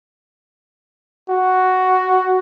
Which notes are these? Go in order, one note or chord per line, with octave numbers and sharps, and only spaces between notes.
F#4